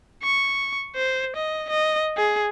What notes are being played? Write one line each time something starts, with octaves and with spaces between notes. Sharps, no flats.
C#6
C5
D#5
D#5
G#4